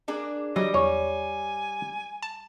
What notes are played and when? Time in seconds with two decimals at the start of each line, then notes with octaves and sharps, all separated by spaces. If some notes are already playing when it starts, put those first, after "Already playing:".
0.08 A#3 D4 G#4
0.56 E3 F#3 G3 D#5
0.74 E2 C#5 G#5
2.23 A5